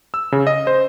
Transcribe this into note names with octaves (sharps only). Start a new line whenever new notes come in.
E6
C#3
D#5
C5